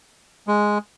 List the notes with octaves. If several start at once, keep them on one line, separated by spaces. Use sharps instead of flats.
G#3